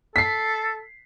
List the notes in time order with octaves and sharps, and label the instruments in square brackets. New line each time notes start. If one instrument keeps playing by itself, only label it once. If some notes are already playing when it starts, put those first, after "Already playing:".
[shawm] A4 [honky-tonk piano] B6 C7